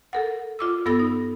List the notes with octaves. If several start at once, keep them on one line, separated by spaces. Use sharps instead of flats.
A4 A#4 F#5
F4 D6 E6
G2 B3 A4 B5 E6 A#6
D#4